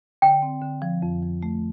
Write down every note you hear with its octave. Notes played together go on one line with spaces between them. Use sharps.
D3 G5
C4
D3
F3
F2
F3
A3